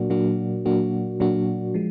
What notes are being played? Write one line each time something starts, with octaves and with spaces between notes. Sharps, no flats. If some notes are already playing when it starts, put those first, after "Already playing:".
Already playing: A#2 F#3 A#3 D4 F#4
A#2 F#3 A#3 D4 F#4
A#2 F#3 A#3 D4 F#4
A#2 F#3 A#3 D4 F#4
F3 G#3